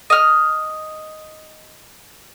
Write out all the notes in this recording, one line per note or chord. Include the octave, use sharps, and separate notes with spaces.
D#5 F6